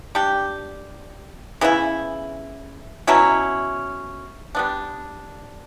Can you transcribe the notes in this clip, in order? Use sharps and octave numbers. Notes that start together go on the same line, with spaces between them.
G3 D4 G4
C#3 E3 B3 E4
B2 F#3 C#4 E4
G3 B3 D4